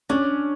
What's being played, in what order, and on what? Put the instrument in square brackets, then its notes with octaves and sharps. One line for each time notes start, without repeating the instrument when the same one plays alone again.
[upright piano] C#4 [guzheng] D4